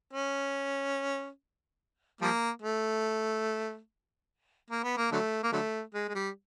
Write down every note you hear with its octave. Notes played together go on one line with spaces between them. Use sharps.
C#4
F3 G3 A#3
A3
A#3
B3
A#3
D3 F#3 A3
A#3
D3 F#3 A3
G#3
G#3
G3